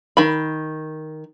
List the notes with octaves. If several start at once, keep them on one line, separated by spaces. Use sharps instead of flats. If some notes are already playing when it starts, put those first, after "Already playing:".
D#3 B5